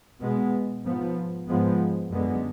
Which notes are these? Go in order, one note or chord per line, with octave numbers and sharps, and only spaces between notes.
B2 G#3 B3
G#2 F3 B3
G#2 F3 G#3 B3
F#2 D3 G#3 B3